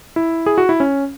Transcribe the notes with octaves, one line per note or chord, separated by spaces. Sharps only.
E4
G#4
F#4
E4
C#4